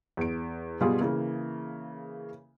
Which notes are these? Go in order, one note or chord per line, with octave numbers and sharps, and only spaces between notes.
E2 D7
B2 G3 F4 G#4
C#3 E3 A#3